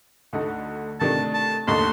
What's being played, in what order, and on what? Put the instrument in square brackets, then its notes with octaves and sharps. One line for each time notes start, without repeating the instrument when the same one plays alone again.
[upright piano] D2 D3 A3 D#4
[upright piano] C3 D#3 A3 D4 [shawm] A5
[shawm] A5
[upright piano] D#2 D3 A3 D#4 A4 [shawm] C6